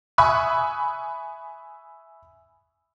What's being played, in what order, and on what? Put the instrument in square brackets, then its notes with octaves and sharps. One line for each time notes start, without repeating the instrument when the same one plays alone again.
[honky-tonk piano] E5 G#5 B5 C#6 D#6 F#6